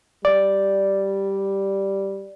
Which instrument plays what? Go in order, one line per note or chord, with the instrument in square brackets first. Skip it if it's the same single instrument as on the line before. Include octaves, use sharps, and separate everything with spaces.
[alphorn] G3 [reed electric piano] D5